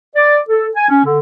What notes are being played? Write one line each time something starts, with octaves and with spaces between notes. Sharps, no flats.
D5
A4
G#5
C#4
D3